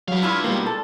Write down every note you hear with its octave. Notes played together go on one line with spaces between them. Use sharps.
F#3 B4 F5
D4 E4 F4 B5
B2 G3 A#3
A4